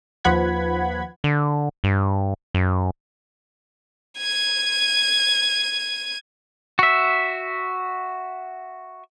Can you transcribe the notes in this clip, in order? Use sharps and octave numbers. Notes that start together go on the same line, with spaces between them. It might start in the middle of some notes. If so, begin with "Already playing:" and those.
D#2 F3 B4 F#5 B5 G#6
D3
G2
F#2
G#6 D#7
F#4 E5